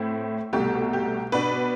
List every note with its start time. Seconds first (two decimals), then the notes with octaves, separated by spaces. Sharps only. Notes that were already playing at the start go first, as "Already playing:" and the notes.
Already playing: A2 C4 E4
0.53 C2 B2 A3 G4
0.93 G4
1.32 B2 B3 D4 B4